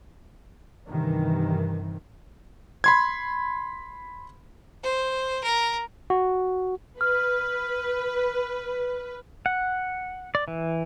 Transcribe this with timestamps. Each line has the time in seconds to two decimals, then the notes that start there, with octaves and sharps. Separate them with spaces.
0.89 G2 C3 D#3 E3
2.84 B5 C6 G#6
4.83 C5
5.43 A#4
6.10 F#4
7.01 B4 F6
9.46 F#5
10.35 D5
10.48 E3